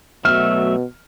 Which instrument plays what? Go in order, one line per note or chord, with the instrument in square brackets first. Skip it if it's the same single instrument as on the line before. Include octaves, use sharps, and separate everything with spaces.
[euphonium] B2 [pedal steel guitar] F#3 A3 E5 [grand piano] F6